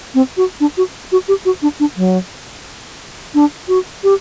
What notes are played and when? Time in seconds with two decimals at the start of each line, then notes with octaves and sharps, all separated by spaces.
0.15 C4
0.37 F#4
0.60 D4
0.77 F#4
1.12 F#4
1.28 G4
1.45 F#4
1.62 D4
1.80 D4
1.97 F#3
3.35 D4
3.68 F#4
4.04 G4